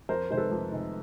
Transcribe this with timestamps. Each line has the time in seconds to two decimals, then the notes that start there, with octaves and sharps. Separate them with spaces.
0.09 F2 A#4 C5
0.30 C3 D#3 G#3 C5
0.37 A4 B4
0.51 F2
0.72 C3 D#3 G#3